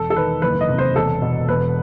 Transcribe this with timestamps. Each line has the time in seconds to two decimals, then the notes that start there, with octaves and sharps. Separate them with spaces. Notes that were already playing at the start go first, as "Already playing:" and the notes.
Already playing: E1 A4
0.10 A4
0.16 D#3 B4
0.42 F#1 B4
0.61 D#5
0.69 C3
0.78 C5
0.95 E1 A4
1.22 B2
1.48 E1 B4